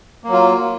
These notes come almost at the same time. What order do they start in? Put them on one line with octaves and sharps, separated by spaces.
A#3 F#3 F4